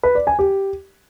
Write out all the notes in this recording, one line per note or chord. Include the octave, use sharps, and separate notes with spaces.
B4
D5
G#5
G4